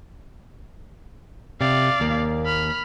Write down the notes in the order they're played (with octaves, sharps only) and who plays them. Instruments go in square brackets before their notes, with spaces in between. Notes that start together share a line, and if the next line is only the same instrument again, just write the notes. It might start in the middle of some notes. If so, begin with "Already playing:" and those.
[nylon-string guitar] C3 [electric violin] D5 F5
[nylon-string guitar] D#2 A#3
[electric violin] B5 F6